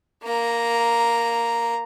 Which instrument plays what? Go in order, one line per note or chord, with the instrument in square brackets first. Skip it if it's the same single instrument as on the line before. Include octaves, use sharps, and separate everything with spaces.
[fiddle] A#3 A#5